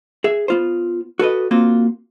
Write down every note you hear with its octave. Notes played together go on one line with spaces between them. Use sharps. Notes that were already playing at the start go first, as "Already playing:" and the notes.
G#4 E5
B3 F4 C5
F#4 A4 B4 D#5
A#3 C4 F4 F#4